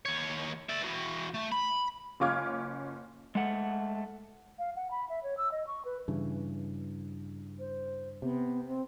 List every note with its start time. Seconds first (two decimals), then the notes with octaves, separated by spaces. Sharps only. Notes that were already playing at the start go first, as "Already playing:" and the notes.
0.06 D#2 C#5
0.70 D5 E5
0.82 E3 F#4
1.34 A3
1.52 B5
2.20 F#1 C#4 F4 D6 F6 G#6
3.35 G#3 A3 F#5
4.59 F5
4.76 F#5
4.91 B5
5.09 E5
5.23 C#5
5.37 E6
5.52 D#5
5.67 C#6
5.85 B4
6.08 G2 C#3 E3
7.59 C5
8.22 C3 B3
8.67 C4